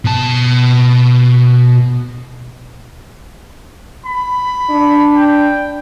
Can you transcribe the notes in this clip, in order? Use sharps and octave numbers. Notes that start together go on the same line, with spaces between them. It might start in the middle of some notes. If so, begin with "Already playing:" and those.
B2 A5
B5
D4
G5